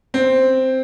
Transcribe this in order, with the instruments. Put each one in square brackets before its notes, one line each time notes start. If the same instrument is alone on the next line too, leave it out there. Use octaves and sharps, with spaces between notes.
[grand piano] C4